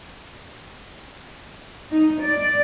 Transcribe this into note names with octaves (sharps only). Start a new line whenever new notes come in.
D#4
D5